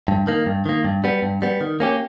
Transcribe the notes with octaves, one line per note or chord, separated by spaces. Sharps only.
G2
D#3 A#3
G2
D#3 A#3
G2
G3 B3
G2
G3 B3
D#3
A#3 C#4 G4